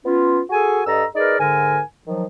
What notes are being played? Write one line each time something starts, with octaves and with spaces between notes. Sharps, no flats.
B3 C#4 F4
F#4 G#4 A4 G#5
G2 A4 D#5 A#5 E6
D#4 G#4 A#4 B4 D5
G#2 D3 A#4 G#5
D#3 F3 F#3